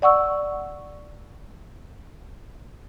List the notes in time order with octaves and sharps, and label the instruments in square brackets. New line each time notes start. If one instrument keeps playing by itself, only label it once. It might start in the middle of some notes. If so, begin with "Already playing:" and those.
[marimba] D5 F#5 C#6 E6